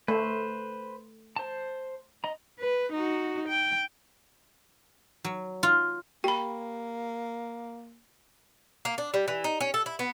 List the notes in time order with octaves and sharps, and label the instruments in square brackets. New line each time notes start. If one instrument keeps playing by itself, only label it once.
[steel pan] A3 [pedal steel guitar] B4 C5
[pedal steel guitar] C5 A5
D#5 A#5
[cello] B4
D#4 F#4
G5
[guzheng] F#3
F4
[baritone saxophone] A#3 [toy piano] G4 [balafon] G5 B5
[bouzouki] A#3
D4
G3
E3
D#4
C#4
A4
E4
B3